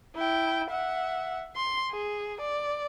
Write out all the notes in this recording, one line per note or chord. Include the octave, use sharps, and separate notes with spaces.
E4 G5
E5 F#5
C6
G#4
D5